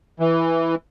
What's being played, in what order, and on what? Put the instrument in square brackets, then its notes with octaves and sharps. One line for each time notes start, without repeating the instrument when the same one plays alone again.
[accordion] E3